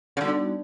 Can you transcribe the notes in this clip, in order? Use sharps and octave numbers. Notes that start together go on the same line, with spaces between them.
C#3
D3 G3 B3 D#4 F#4